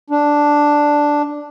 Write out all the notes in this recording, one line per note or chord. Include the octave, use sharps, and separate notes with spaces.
D4